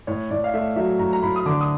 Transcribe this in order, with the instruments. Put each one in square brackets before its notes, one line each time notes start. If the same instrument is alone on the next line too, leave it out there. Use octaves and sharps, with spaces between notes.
[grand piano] A2 C#5
A2 D5
F5
A3 E5
F#3 E5
A2 A#5
A#5
A2 B5
D#6
D3 D6
D#6